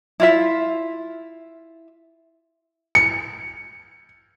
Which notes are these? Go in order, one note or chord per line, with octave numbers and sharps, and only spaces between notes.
E4 F4 E5
C#7